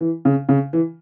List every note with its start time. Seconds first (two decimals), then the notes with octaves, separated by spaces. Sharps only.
0.01 E3
0.25 C#3
0.49 C#3
0.73 E3